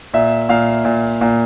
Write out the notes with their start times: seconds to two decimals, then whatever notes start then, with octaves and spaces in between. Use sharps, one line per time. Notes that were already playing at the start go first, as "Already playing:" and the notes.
0.14 A#2 E5
0.49 A#2 F5
0.85 A#2
1.21 A#2